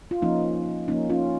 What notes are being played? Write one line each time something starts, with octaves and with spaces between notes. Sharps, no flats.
F4
F3 A#3 C#4 D#4
F3 A#3 C#4 D#4
C#4 F4